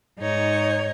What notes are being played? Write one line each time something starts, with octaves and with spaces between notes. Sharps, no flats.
G#2 D#4 C#5